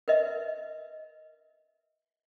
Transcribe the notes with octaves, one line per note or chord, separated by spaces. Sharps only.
A#4 B4 D#5 E5